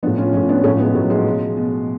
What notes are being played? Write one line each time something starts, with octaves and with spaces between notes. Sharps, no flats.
A2 F3 B3 D4
C#4 F4
A2 F3 C#4 F4
B3 D4
A2 F3 A3 C#4
G#3 B3
A2 F3 F#3
F3 G#3
B2
B2